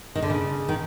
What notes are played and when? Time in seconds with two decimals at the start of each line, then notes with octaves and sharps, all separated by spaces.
0.15 D#3
0.22 D3
0.30 C#3
0.69 D#3